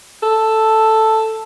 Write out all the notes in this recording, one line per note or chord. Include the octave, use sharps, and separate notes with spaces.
A4